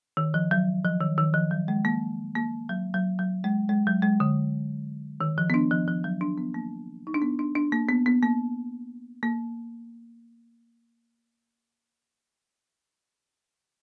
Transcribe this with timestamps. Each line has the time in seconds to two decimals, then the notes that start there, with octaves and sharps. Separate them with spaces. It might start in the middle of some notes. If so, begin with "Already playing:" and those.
0.17 D#3
0.34 F3
0.51 F#3
0.84 F3
1.01 D#3
1.18 D#3
1.34 F3
1.51 F#3
1.68 G#3
1.85 A#3
2.36 A#3
2.69 F#3
2.94 F#3
3.19 F#3
3.44 G#3
3.69 G#3
3.87 F#3
4.02 G#3
4.20 D3
5.21 D#3
5.38 F3
5.50 B3
5.54 D4
5.71 F3
5.87 F3
6.04 F#3
6.21 D4
6.38 B3
6.54 A#3
7.07 D#4
7.14 D4
7.22 B3
7.39 D4
7.55 D4
7.72 A#3
7.89 B3
8.06 B3
8.23 A#3
9.23 A#3